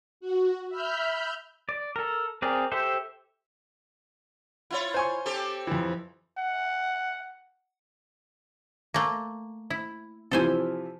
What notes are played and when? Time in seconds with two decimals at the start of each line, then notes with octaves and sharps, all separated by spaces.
0.21 F#4
0.69 E5 B5 F6 G6
1.69 D5
1.96 A4 A#4
2.42 C4 G#4 A#4 D5
2.72 G4 A4 C5 E5
4.71 E4 F4 C#5
4.94 C5 G#5 C#6
5.26 C4 G4 A4
5.67 F2 E3
6.38 F#5
8.94 A3 A#3
9.70 E4
10.31 C3 E3 F3 A4 C5 G#5